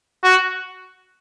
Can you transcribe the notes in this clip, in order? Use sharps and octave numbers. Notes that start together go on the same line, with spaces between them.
F#4